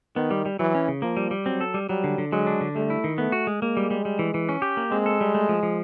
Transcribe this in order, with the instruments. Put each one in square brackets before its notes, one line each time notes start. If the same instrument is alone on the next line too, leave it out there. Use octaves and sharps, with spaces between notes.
[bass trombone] D#3 [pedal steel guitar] B3
[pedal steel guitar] G3
G3
[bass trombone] E3 [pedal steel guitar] F#3
[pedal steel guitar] C#4
C#3
[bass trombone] F3 [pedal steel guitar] A#3
[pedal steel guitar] G3
G3
[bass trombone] F#3 [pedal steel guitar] C4
[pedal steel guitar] A4
G3
[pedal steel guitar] F#3 [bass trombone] G3
[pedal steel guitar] D3
D3
[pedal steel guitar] F#3 [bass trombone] G#3
[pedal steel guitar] D4
D3
[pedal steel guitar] G3 [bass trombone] A3
[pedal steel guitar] E4
D#3
[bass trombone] A3 [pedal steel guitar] B3
[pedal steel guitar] F#4
G#3
[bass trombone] G#3 [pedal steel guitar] A#3
[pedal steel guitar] G3
G3
G3
E3
E3
C#4
G4
A#3
[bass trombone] G#3 [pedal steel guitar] C4
[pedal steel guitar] A4
G3
A3
F3
F3